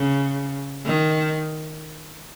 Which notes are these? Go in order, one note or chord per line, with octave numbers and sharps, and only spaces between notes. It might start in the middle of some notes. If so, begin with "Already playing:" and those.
Already playing: C#3
D#3